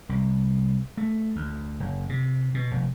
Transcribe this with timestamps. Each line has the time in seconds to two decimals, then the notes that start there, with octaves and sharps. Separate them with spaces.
0.09 C2
0.97 A3
1.36 D2
1.80 F#1
2.09 C3
2.54 B2
2.71 F1